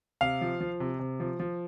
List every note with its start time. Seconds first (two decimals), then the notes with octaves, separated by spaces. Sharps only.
0.21 C3 F5
0.41 F3
0.60 F3
0.80 C3
0.99 C3
1.20 F3
1.40 F3